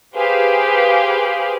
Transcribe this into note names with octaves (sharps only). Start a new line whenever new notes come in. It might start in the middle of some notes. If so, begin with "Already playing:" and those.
G4 G#4 B4 C5 F5